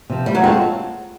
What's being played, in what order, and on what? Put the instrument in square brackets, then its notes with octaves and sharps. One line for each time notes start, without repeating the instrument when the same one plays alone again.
[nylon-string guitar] C3 F3
[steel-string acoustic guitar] G3 [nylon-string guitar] A3
[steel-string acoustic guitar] F#3
[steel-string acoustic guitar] G#3 [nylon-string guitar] C4 F4 A4 C#5